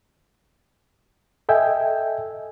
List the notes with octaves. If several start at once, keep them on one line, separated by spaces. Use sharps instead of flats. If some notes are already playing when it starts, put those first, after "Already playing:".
A4 D#5 E5 G5 G#5